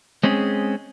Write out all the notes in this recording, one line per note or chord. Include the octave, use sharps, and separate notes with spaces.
G#3 C4 C#4 G#4